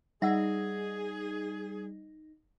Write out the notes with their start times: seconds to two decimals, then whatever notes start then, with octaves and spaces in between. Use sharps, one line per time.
0.22 G3 D#4 G#4 E5 F#5 E6